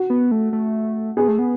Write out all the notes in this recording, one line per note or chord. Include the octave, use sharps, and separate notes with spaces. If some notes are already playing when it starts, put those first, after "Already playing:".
Already playing: F#4
B3
A3
A3
B3 G#4
A3
B3